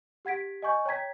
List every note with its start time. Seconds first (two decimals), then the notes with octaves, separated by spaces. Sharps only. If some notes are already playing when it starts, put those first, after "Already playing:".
0.25 G4 F#5 G#6 B6 D7
0.62 D#5 G#5 C#6 G6
0.86 C#5 G5 A#5 G#6 B6